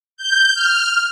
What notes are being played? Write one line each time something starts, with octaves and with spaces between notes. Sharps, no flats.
G6
F6